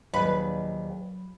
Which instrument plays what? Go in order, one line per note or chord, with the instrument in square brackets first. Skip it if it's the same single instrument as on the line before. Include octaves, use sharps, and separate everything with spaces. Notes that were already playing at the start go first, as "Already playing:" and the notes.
[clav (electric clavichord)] A#1 D#2 [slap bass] F#3 [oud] B4